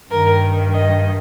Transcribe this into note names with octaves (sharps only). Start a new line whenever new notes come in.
G2 D#3 A#4
D#5